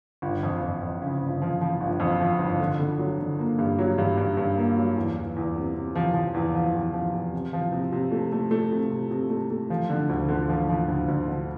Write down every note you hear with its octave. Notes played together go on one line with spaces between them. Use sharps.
G1
F2
F2
F2
C#3
G1
F3
F3
G1
F2
F3
G1
D3
D3
F#3
D3
A#3
G2
F#3
G2
G2
G2
A#3
F#3
E2
E2
E2
C3
C3
F3
F3
E2
F3
E2
F3
E2
C3
F3
C3
C3
A3
A3
A3
C3
C3
C3
A3
A3
F3
D3
D2
D3
F3
F3
D2
D2
D3